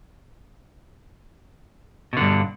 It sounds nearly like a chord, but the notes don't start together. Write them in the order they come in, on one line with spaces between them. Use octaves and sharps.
B2 D3 G2